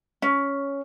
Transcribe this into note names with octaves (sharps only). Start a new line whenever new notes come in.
C#4